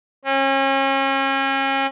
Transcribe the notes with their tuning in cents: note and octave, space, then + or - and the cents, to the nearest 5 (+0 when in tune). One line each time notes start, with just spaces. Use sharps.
C#4 -35